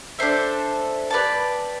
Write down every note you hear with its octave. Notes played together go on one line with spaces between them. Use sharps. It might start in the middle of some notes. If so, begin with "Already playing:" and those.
D4 A4 C5 E5
G4 B4 D5 A5